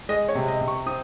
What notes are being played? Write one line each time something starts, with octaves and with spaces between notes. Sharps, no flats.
G#3 D#5
C#5
C3
D#5
C3
C#6
C4 D#6